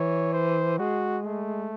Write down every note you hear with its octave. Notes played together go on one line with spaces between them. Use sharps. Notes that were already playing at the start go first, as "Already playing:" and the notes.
Already playing: E3 C#5
C5
G#3 F#4
A3